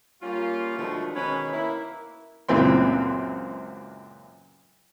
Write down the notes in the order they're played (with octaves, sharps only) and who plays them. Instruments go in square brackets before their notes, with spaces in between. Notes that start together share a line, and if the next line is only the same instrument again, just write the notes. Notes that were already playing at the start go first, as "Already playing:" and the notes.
[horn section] G3 A#3 C#4 F4
B2 D3 D#3 F3 G#3 A3
B2 D#3 G#3 C#4 B4 B5
A#3 E4
[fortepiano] C#2 F#2 A#2 E3 C4 C6